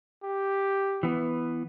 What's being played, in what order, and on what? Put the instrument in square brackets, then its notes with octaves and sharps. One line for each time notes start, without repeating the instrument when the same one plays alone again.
[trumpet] G4
[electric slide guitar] E3 B3